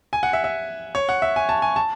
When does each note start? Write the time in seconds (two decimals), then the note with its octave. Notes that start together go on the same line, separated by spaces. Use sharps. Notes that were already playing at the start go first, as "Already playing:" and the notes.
0.13 G#5
0.23 F#5
0.33 E5
0.44 E5
0.95 C#5
1.09 F#5
1.22 E5
1.36 G#5
1.49 A5
1.62 G#5
1.76 A5